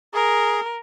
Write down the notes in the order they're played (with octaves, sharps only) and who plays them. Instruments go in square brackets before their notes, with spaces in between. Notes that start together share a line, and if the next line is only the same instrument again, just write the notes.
[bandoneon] G#4 [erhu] A#4